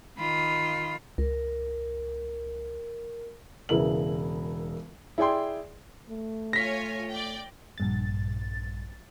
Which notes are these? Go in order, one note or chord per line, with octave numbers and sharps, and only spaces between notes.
D#3 F4 B5
C#2 A#4
E1 C#3 E4 A#4 B4 F#7
E4 G#4 D5 G5 C6
A3
F4 C#5 G#5 A#6 B6
D5 G5
A#1 G2 A6